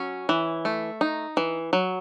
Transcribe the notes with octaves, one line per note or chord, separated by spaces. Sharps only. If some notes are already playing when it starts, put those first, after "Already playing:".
Already playing: F#3 C#4
E3
A3
D#4
E3
F#3